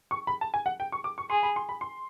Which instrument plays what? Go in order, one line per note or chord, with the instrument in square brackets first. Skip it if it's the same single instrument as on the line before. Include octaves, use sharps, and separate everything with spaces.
[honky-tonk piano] C#6
B5
A5
G#5
F#5
G5
C#6
D6
C#6
[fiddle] G#4 [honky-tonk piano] C6
[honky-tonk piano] B5
C6
B5
C6